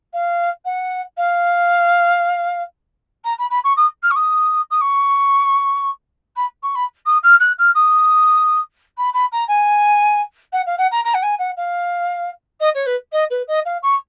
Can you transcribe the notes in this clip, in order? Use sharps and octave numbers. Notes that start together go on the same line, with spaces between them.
F5
F#5
F5
A#5
B5
B5
C#6
D#6
F6
C#6
D#6
D#6
C#6
B5
C#6
B5
D#6
F6
F#6
F6
D#6
B5
B5
A#5
G#5
F#5
F5
F#5
A#5
A#5
F#5
G#5
F#5
F5
D#5
C#5
B4
D#5
B4
D#5
F5
C#6